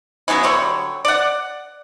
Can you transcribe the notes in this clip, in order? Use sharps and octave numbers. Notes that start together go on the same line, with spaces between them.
F#3 B3 C#4 E4
D3 F#3 G3 C#5
D5 F#5